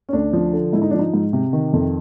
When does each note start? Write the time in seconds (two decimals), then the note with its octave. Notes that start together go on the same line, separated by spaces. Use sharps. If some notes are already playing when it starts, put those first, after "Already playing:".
0.09 C#4
0.13 D2 D4
0.33 F3
0.53 D3
0.73 G#2 E4
0.82 D#4
0.91 F3 D4
0.99 D#4
1.14 G#2
1.33 C3
1.53 D#3
1.73 F2